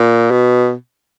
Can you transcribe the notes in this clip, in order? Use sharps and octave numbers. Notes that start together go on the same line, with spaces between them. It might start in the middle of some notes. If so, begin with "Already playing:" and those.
Already playing: A#2
B2